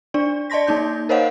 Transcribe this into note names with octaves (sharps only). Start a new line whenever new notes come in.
D4 D5
D5 D#5 A5 C6 A#6 B6
A#3 D#4 G6
A#4 C5 C#5 D#5 F5 F#5